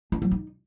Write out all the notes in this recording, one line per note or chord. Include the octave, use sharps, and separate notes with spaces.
D4
F#3
D#4